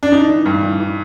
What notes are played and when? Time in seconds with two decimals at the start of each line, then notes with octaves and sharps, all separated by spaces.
0.03 D4
0.12 E3 D#4
0.29 E3
0.46 G2
0.63 E3
0.80 E3